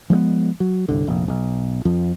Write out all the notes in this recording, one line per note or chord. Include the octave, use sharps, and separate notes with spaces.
F3 G#3 A3 B3
F#3
G1 C2 D3
F1 A#1
B1
F2 F3